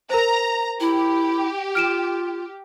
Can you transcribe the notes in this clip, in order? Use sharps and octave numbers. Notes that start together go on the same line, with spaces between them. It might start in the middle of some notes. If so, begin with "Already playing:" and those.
A#4 C5 A#5
E4 G4
F4 F6 D7 E7